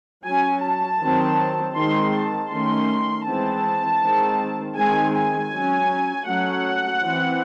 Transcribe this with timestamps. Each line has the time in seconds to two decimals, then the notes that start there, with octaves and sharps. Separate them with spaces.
0.24 F#3 C#4 G#5
0.63 A5
1.00 D#3 F#3 C4
1.75 D#3 G#3 C4 C6
2.13 A5
2.50 D#3 A3 C#4 C6
3.26 E3 G#3 C4 A5
4.02 D#3 G#3 C4
4.77 D#3 G#3 C4 G#5
5.14 G#5
5.52 F#3 C#4
6.28 F#3 A3 C#4 F#5
7.03 E3 C4